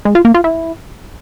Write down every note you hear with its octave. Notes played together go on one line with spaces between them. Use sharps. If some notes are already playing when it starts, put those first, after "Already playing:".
G#3
F4
A#3
F4
E4